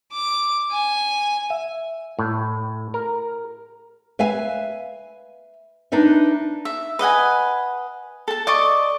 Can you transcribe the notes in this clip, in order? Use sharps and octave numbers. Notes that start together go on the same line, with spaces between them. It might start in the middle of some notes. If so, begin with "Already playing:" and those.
D6
G#5
E5
A2
A#4
B4 E5 F5 G#5
D4 D#4 B4 E5
E5
B4 D#5 F#5 G#5
A4 A5
D5 D#5 C#6